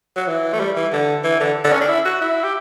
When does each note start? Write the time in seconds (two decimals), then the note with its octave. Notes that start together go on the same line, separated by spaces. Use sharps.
0.16 F#3
0.27 E3
0.53 A3
0.60 G3
0.76 E3
0.92 D3
1.24 E3
1.40 D3
1.65 D3
1.72 C#4
1.81 D4
1.89 E4
2.05 F#4
2.21 E4
2.44 G4